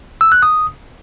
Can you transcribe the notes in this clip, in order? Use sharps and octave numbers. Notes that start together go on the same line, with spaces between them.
E6
F#6
D#6